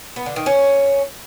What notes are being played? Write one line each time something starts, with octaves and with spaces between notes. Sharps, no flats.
B3
D3
D#3
C#4